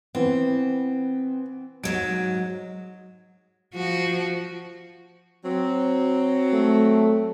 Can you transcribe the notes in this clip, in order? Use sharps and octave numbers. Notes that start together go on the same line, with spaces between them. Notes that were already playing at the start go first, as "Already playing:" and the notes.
E3 B3 C4
G#2 F#3 G#3 D7
F3 F#4
F#3 C4
A3